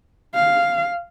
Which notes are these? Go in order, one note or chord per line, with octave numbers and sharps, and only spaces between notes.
F5